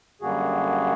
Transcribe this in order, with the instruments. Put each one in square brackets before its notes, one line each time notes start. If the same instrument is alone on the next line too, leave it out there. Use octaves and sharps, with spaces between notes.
[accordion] F#2 D3 G3 A#3 F#4 G#4